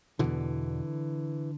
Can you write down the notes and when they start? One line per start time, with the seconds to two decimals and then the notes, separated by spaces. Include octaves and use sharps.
0.19 E2 B2 D3 E3